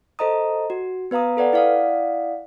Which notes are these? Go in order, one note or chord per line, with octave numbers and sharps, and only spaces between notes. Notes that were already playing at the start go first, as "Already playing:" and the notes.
A4 C5 D#5 A#5 D#6
F#4
B3 B4 F5 A#5 D#6
A4 B4 D5 F#5
E4 D5 F5 F#5 D#6